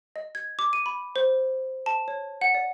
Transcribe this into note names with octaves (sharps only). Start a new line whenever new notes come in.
D#5
G#6
D6
D#7
B5
C5
A5
C#5
F#5
D5